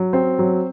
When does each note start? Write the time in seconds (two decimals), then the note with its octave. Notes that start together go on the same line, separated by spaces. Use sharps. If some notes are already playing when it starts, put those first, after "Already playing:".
Already playing: F#3
0.13 C4
0.39 F#3